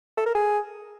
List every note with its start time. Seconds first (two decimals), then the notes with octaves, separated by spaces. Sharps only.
0.17 A4
0.26 A#4
0.35 G#4